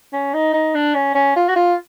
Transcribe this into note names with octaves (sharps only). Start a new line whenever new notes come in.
C#4
D#4
D#4
D4
C#4
C#4
F4
F#4
F4